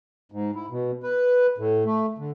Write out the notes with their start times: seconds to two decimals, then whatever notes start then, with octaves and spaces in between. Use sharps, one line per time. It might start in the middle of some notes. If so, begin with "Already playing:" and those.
0.32 G#2
0.55 E4
0.70 B2
1.03 B4
1.58 A2
1.85 A3
2.18 D3